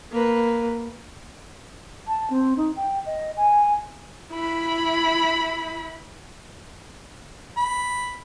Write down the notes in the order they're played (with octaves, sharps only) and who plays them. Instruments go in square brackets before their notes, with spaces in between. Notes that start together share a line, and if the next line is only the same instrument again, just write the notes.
[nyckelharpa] A#3 B4
[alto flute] A5
C4
D#4
G5
D#5
G#5
[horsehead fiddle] E4 B5
[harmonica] B5